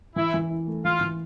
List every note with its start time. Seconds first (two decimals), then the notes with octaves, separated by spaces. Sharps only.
0.16 E3 E4
0.34 E3
0.50 E4
0.67 A3
0.84 E3 F4
1.01 E3